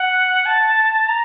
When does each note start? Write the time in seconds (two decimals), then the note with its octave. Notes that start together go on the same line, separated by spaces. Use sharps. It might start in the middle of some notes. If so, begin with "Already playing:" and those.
Already playing: F#5
0.46 A5
1.08 A#5